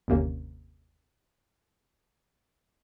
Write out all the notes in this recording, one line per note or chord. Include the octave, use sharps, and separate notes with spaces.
G1 D#2 C3 A#3 C#4